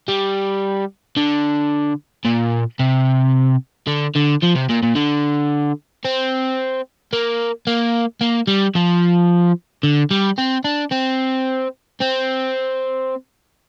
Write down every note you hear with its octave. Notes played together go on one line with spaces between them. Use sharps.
G3
D3
A#2
C3
D3
D3
F3
C3
A#2
A#2
D3
C4
A#3
A#3
A#3
G3
F3
D3
G3
C4
D4
C4
C4